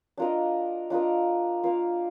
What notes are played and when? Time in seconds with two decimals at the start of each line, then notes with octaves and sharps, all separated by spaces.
0.17 D4 F4 A#4 D#5
0.90 D4 F4 A#4 D#5
1.63 A#3 F4 A#4 F5